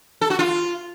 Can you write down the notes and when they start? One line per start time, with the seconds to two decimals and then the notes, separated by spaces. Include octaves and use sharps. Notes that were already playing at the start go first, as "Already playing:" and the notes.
0.21 A4
0.30 F#4
0.39 F4